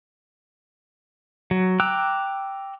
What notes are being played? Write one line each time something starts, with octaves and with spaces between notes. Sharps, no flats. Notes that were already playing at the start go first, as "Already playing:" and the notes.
F#3
G5 A#5 D6 E6 F#6